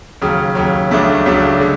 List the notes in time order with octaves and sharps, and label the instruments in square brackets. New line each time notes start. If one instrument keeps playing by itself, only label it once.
[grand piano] D#2 C#3 F#3
D#2 C#3 F#3
C#2 C#3 F#3 A3 D4
C#2 C#3 F#3 A3 D4
D3 G#3